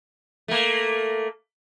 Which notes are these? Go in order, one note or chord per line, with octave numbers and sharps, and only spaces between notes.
A3 A#3